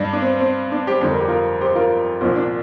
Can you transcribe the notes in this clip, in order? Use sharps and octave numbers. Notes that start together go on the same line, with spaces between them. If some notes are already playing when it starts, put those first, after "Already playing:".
Already playing: G2 G3 D4
D4
C4
C4
D4
G4 C5
F2 D3 G3 C5
A#4
G4
F4 A#4
G4 C5
F4 A#4
C2 A#2 F3 C4 F4
D4